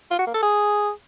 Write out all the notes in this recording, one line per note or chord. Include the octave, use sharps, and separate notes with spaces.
F4
F#4
A#3
A4
G#4